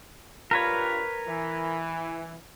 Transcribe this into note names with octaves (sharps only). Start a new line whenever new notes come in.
G2 F4 A#4 B4 C#5
E3